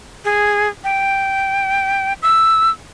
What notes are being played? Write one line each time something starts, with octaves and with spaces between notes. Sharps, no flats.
G#4
G5
E6